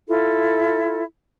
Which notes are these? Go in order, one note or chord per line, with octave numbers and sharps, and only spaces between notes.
E4 F4 A4